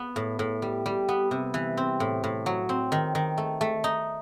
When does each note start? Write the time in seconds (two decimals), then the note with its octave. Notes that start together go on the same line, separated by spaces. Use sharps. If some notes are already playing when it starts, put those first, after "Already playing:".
Already playing: B3
0.16 A2
0.39 A2
0.62 G3
0.86 G3
1.09 B3
1.31 C3
1.54 E3
1.77 C4
2.00 A2
2.24 A2
2.46 F#3
2.69 C4
2.92 D#3
3.15 D#3
3.38 A3
3.61 A3
3.84 D#4